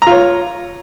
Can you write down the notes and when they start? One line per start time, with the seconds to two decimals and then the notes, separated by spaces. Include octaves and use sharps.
0.02 A#5
0.07 F4
0.11 C#5